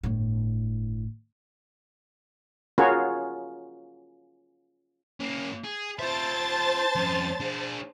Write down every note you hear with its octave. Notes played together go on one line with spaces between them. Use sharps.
G1 A2
C#4 F4 F#4 G#4 A#4 C#5
A#3 C#4
G#4
F4 C5 E5 A5 A6
F2 C#4
D4 G#4